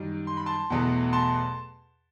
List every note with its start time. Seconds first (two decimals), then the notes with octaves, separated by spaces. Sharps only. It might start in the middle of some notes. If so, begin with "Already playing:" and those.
Already playing: F#2 D#3 G3
0.27 C6
0.37 B5
0.46 A5 C6
0.70 E2 B2 F#3 A3
1.13 A5 C6